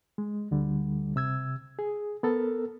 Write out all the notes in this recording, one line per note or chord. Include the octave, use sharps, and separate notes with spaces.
G#3
D2 D3 G3
C3 E6 G#6
G#4
B3 A4 A#4